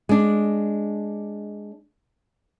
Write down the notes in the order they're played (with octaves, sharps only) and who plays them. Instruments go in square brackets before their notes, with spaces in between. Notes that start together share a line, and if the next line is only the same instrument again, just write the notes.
[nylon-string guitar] G#3 D4